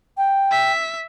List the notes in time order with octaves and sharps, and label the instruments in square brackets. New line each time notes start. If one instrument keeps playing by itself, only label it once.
[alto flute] G5
[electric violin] E5 B6